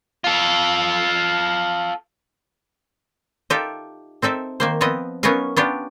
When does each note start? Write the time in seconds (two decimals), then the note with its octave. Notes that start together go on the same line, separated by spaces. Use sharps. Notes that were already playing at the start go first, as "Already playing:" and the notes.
0.24 F4 A4
3.50 D#4 F4 G4 A4 E5
4.22 C4 D#4 A4 E5
4.60 D#3 A#3 C5
4.81 F3 B3 C4 D#5
5.23 F#3 B3 C#4 D#4 A#4 F5
5.57 B3 C#4 D4 F4 G4